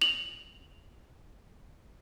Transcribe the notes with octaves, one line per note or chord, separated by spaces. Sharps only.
F7 F#7